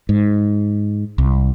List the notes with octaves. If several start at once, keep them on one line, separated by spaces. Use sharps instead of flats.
G#2
C2